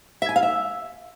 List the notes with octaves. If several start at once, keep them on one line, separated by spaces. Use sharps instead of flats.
E5
G#5
F5
E5